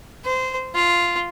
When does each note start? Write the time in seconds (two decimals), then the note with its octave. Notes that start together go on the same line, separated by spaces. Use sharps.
0.25 C5
0.75 F4